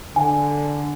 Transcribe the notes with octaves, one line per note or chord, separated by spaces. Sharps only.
D3 G#5